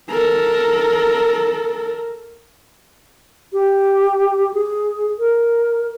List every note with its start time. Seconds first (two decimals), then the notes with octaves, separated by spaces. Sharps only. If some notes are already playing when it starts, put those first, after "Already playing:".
0.10 A4 A#4
3.53 G4
4.54 G#4
5.19 A#4